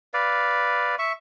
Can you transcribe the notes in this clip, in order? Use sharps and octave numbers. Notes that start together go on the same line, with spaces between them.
B4 D5 F5
E5 C#6